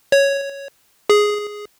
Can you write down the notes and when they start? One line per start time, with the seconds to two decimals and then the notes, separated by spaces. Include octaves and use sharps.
0.12 C#5
1.10 G#4